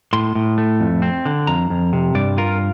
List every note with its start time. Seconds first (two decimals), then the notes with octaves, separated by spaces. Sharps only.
0.13 A2 C6
0.35 A2
0.58 A3
0.80 F2
1.02 C4
1.25 D3
1.47 F2 A#5
1.70 F2
1.93 C3
2.15 G2 D5
2.38 F4 A#4